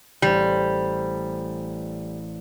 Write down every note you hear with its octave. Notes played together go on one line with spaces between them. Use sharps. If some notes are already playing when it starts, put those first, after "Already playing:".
A1 G3 C5